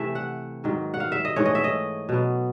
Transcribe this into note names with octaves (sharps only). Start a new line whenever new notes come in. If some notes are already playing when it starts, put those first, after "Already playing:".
Already playing: C3 E3 A3 E5
F#5
G#2 D#3 F#3
F#5
F5
E5
D#5
G#2 E3 A3 C#5
D#5
E5
D#5
B2 F#3 B3